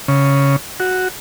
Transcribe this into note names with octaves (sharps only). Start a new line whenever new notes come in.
C#3
F#4